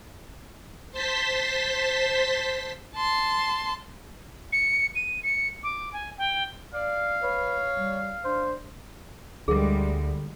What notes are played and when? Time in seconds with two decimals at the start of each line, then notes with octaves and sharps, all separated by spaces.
0.92 C5 A5 C6 B6
2.95 A5 C6
4.53 C#7
4.96 D#7
5.23 C#7
5.63 D6
5.93 G#5
6.18 G5
6.74 D5 F5
7.23 B4 C#5
7.76 G3
8.25 D4 C5
9.48 D2 D3 G3 G#3 G#4 A#4